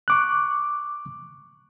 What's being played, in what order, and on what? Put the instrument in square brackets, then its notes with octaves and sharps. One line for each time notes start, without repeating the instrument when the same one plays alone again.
[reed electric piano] C#6 D6 F#6